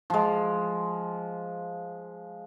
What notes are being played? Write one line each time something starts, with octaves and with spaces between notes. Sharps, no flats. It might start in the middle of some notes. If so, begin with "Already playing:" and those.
F3 G#3